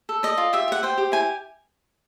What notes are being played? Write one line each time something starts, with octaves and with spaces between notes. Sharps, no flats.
A4
D5 D#5
F4
G4 E5
G4 F#5
C5 G5
G4
E4 G#5